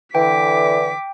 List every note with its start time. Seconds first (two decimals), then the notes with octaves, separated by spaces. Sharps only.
0.15 D3 E3 G5 D6 B6